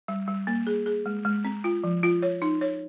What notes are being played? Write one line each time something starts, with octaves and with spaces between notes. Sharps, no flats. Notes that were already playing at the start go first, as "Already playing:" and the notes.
G3
G3
A#3
G#4
G#4
G#3
G#3
C4
F4
F3
F4
C#5
D#4
C#5